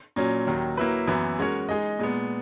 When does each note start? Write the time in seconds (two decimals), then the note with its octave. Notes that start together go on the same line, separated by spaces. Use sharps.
0.16 A#2 F#3 C#4
0.47 D#2 D#3 F#3
0.77 F#3 A#3 E4 B4
1.08 F#2 E3 B3 E4
1.39 G#3 C#4 F#4 A#4 C#5
1.69 G#3 D#4 G#4 D#5
1.99 A#2 G#3 B3